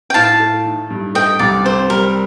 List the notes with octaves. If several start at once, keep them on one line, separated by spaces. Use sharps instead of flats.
G5
A2 F5 A5
A3
D#3
G2
A3 D#5 G5
C2 D5
C4 C5
G3 A#4